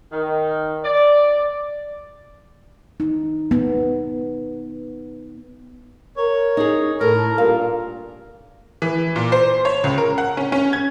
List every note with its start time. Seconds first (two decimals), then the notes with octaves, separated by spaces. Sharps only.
0.12 D#3
0.84 D5
3.00 D#4
3.51 B3
6.18 A#4 C#5
6.57 D#4 G#4
7.01 A2 A4 A#4
7.38 G2 A#2 F5
8.82 E3
9.16 A#2
9.32 C5
9.65 C#5
9.84 C#2
9.98 A#4
10.18 F#5
10.37 C#4
10.52 C#4
10.73 G#6